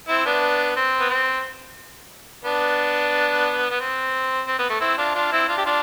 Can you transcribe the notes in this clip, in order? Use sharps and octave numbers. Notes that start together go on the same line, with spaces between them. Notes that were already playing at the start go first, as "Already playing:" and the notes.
C4 E4
B3 D4
C4
B3
C4
B3 D4
B3
C4
C4
B3
A3
C4 E4
D4 F4
D4 F4
C4 E4
D4 F4
G4
D4 F4